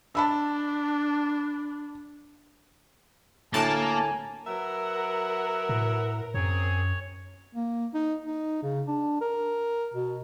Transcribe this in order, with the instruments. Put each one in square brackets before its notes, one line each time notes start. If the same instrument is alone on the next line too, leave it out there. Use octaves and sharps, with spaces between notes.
[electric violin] D4 [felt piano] A5 B5 E6
[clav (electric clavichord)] D2 A2 [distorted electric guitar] A#3 [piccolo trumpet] G#5 [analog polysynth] A5
[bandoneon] F#3 [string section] A#4 [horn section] B4 E5 F#5
[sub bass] A2
[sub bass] F#2 [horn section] C4 G#4 [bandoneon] C#5
[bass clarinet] A#3
D#4
D#4
C#3
D4
A#4
B2